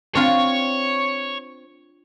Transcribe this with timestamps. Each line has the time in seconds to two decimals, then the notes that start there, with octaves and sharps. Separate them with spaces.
0.15 C4 D4 F4 C#5